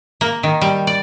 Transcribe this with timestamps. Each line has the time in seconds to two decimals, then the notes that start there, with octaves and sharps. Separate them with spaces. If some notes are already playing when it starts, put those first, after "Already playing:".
0.21 A#3
0.43 D#3
0.61 G3
0.87 D5